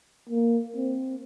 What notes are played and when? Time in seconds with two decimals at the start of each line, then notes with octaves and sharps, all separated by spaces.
0.29 A#3
0.76 C4